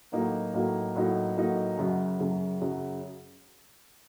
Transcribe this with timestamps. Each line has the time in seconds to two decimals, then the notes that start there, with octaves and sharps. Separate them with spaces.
0.12 A2 F#3 A#3 D#4 F#4
0.53 A2 F#3 A#3 D#4 F#4
0.95 A2 F#3 A#3 D#4 F#4
1.36 A2 F#3 A#3 D#4 F#4
1.78 F#2 C#3 F#3
2.20 F#2 C#3 F#3
2.61 F#2 C#3 F#3